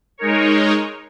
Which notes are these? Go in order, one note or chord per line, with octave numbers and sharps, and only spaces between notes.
G#3 D#4 A#4 C#5